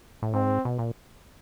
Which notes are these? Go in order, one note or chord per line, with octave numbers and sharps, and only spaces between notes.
A2
G#2 C4
B2
A#2